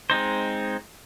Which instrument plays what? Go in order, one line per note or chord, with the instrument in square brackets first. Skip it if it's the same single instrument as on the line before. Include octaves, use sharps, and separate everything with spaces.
[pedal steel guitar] G#3 C4 D#4 C5